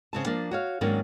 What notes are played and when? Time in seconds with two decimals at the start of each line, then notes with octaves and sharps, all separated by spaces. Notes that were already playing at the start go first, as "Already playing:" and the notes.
0.13 C#3 C4 A5
0.26 F3 A#3 D4
0.51 F#4 C#5 F5
0.81 G#2 D#3 F#3 A#3 C#4 D4